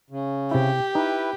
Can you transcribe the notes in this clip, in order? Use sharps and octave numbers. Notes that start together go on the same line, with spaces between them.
C#3
C3 E4 G4
D#4 E4 B4